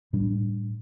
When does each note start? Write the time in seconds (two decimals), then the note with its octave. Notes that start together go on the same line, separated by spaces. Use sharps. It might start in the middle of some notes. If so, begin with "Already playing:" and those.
0.13 A2 G3 D4